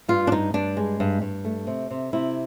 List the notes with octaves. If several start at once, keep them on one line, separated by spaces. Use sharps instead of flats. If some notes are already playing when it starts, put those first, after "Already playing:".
G2 F4
D4
G2 D#4
G2 D4
G#3
G2
G2
A3
C3
C3
C3 E4